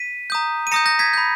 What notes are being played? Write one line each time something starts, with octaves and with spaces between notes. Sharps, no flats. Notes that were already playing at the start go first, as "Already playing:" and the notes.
Already playing: B6 D#7
A#5 D#6 G6
D#7
A#5 D#6 G6 A#6 C#7
G6 A#6
G#6 B6
B5 G6